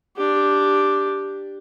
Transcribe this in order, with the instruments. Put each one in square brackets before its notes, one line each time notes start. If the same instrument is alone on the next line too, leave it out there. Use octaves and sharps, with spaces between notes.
[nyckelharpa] D4 G4